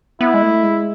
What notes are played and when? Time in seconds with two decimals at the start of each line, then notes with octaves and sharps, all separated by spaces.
0.21 B3 E4
0.34 G#3
0.43 A3
0.63 G#3